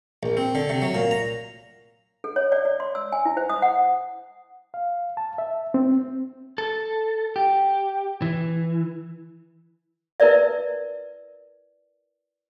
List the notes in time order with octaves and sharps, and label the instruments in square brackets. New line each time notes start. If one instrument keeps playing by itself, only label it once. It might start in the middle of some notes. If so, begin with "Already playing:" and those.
[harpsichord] A#1
C4
D3
C3
F#3
A#2
A#5
[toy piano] A4
C#5
D5
D5
C6
E6
G#5
E4
C5
D#6
F#5
[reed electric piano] F5
A5
E5
C4
[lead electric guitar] A4
G4
E3
[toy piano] E4 A#4 B4 D5 E5